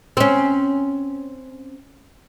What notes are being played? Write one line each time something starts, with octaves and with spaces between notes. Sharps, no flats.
C4 C#4